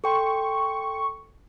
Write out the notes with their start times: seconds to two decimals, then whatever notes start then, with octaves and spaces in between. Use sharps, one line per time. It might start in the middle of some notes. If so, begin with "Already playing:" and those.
0.04 A4 G5 C6 C#6